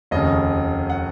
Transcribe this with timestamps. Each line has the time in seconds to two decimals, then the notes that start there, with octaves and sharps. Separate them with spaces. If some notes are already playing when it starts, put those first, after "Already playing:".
0.11 F1 D#2 C#3 D#5
0.90 F#5